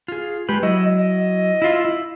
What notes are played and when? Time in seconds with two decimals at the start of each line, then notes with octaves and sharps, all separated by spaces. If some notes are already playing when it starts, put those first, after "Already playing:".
0.08 F4 G#4
0.49 G#3 G4 B4
0.63 F#3 E4 D#5
0.98 D#5
1.62 E4 F4
1.85 E4